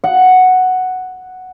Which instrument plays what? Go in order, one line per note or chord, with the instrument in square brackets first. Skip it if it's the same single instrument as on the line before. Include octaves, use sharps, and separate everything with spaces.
[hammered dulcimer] F#5